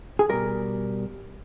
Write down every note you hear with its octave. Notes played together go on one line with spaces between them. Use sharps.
G#4
B2 G3 A#4